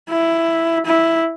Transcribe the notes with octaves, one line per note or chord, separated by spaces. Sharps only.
E4
E4